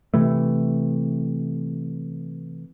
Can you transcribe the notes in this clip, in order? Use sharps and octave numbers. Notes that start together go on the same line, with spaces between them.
C3 E3 A3